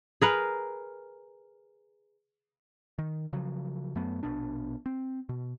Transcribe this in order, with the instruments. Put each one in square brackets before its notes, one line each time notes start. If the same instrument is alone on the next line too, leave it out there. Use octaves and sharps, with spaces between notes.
[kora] G#4 A#4 B4
[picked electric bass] D#3
C#3 F3 F#3
F#2 F#3 A3 B3
A#1 B2 B3 D4
C4
B2